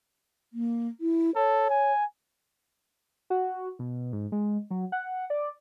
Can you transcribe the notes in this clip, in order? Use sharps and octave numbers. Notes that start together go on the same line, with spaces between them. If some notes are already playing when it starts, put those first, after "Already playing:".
A#3
E4
A4 C#5
G#5
F#4
B2
G#2
G#3
F#3
F#5
D5